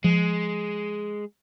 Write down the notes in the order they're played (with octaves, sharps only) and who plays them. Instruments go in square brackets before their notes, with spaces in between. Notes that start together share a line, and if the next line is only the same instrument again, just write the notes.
[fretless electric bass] F3 [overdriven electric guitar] G#3